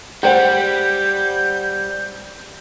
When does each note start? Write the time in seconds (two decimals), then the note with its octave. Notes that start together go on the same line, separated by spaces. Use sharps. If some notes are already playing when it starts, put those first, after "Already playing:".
0.23 G3 C5 F#5 G5 G6